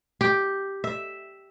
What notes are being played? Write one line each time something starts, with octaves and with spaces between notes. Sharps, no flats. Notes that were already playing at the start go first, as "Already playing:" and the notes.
G4
E5